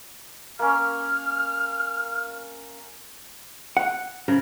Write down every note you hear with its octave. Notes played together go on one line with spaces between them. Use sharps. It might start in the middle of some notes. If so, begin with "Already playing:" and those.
A#3 C#4 F6
F#5
C#3 A#4